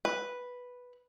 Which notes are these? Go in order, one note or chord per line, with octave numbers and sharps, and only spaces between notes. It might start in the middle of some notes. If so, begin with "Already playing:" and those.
B4